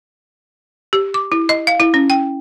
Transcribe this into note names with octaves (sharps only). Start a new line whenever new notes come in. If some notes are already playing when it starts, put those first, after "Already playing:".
G4
D6
E4
D#5
F5
E4
C#4
G5